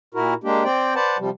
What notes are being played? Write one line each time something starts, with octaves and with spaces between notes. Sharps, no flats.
A#2 E4 F#4 A#4
G#3 A#3 D4 G4
C4 C5 D5 G5
B4 C5 D5 F#5 A5
C3 F3 G3